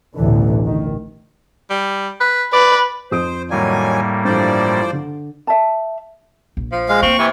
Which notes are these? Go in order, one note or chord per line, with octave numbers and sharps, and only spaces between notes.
A1 D2 B2 D3 E3
D#3
G3
B4
B4 D5
F2 C5 D#6 D7
A2 D#3 F#3 G3 A#3 G#5
G2 E3 F3 A3 C5 D5
D3
E5 A5
A#1
F3
G#3 F5
A#3 C4 C#6
C3 E3